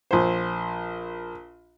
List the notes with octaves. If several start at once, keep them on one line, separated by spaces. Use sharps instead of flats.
A#1 C5